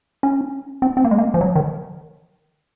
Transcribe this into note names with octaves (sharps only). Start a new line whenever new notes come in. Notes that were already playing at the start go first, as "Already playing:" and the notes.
C#4
C4
C4
A#3
G#3
A#3
F3
F#3
D#3